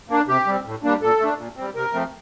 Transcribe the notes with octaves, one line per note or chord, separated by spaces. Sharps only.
A#3 D4
C3 G4
G3 C4
A2
G3 A#3 D4
A#2 A4
A3 D4
A#2
G3 C4
C3 A#4
F3 A3 C4